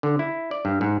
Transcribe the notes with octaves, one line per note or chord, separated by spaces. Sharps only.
D3
E4
D5
G2
G#2